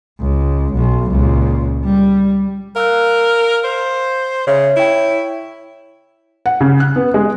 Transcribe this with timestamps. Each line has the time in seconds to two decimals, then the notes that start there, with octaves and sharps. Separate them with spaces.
0.20 C#2
0.74 B1
1.11 C#2 A#2
1.85 G3
2.76 A#4 F5 E6 F#6
3.64 C5
4.47 C#3 C#5 E5
4.77 E4 C#5 G5
6.46 F#5
6.61 C#3
6.80 F#6
6.96 B3
7.14 G#3